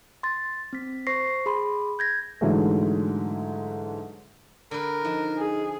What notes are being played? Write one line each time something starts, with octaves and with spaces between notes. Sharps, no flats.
C6 A6
C4 B6
C5 C#6 A#6 C7
G#4 B5 C6
G6 G#6 A#6
G#2 D3 E3 F#3 G#3 A3
D3 A#4 B4
F3 D#4
G#4